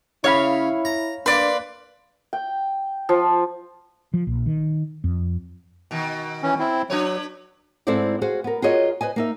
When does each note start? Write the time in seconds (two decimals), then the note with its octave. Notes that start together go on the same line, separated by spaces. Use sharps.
0.24 C#3 E4 C#5 F5 B5
0.85 A#5
1.26 A#3 D4 B4 D5 C6 D6
2.33 G5
3.09 F3
4.14 F3
4.27 A#1
4.46 D#3
5.04 F2
5.91 B2 D#3
6.43 E3 C#4
6.59 C4 E4
6.90 F#3 D4 B4 C#5
7.87 G#2 C4 E4 A4 C5 D5
8.22 F#4 G#4 C5 F5
8.44 B3 A#4
8.62 F4 F#4 G#4 A#4 C#5 D#5
9.01 B4 C5 D#5 G#5
9.16 A#3 D#4 E5